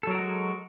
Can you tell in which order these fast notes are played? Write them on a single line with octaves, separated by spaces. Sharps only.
A4 F#3 A#4 F#4 G#3